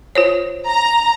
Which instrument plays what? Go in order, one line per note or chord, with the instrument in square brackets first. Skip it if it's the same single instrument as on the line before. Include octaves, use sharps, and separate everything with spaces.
[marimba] F4 C5 C#5
[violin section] A#5